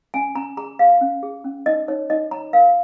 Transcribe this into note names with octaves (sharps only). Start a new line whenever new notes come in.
C#4 G#5
C#4 A#5
G#4 A#5
G#4 F5
C#4
G#4
C#4
D#4 D#5
D#4 C#5
D#4 D#5
C#5 A#5
A#4 F5